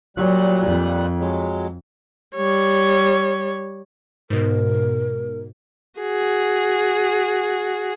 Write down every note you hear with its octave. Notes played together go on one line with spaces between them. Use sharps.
A#2 F#3 G3 F#6
F2
F#3 G#3
G3 C#5
G#2 B2 A#4
F#4 G#4